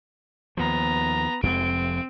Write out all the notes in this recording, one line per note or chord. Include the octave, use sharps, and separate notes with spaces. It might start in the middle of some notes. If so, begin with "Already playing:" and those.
D#2 F3 B3 A#5
F1 F2 G#3 C4 D7